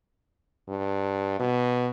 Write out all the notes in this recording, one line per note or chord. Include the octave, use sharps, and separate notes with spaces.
G2
B2